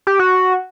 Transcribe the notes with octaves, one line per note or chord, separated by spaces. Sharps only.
G4
F#4